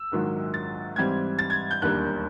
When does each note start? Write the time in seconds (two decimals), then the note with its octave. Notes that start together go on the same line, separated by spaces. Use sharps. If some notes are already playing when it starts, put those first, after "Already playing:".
Already playing: E6
0.12 A#1 G#2 D#3 F#3
0.54 A6
0.96 G#2 E3 G3 C4 G#6
1.39 A6
1.50 G#6
1.71 G6
1.82 E1 D#2 D3 G3 A#3 F#6